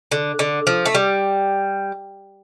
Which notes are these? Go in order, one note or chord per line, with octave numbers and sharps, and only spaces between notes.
D3
D3
F3
A3
G3